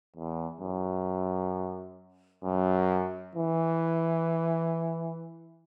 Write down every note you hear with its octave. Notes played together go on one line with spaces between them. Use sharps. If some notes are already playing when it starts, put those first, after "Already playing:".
E2
F#2
F#2
E3